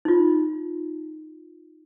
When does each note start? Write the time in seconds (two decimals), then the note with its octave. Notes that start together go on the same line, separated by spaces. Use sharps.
0.05 D#4 F4